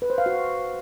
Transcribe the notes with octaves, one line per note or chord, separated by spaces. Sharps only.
B4
C5
F5
F#4